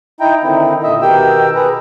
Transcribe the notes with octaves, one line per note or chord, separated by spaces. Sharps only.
D#4 E4 G5 A#5
D3 D#3 C4 D#4 E4
A#2 D3 D#5 E5
B2 D#3 G4 A#4 G5 E6
G#4 B4 A#5